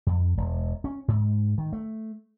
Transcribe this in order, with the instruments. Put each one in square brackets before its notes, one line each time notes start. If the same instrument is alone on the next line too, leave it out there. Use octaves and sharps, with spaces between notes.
[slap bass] F2
E1
C#4
G#2
D#3
A3